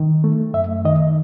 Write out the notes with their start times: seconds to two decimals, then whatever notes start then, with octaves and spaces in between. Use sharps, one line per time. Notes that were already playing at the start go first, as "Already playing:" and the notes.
Already playing: D#3
0.24 A3
0.54 F#2 E5
0.85 D#3 D#5